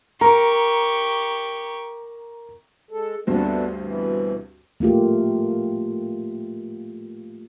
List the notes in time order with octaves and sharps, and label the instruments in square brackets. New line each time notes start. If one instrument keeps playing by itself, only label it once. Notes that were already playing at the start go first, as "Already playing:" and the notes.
[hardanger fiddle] G4 C#6 [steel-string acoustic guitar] A#4 [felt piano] A#5
[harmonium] G#3 A4
[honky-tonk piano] D2 G2 C4 [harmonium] A3 B3 D4
[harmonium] B2 E3
[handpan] A3 A#3 F4 G4